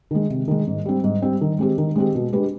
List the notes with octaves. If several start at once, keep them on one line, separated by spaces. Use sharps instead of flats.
D#3 G#3
C3
D#3 G#3
G#2
G3 C4
G#2
G3 C4
D#3
G#3 C4 G4
D#3
G#3 C4 G4
B2
G#3 D4 G4 B4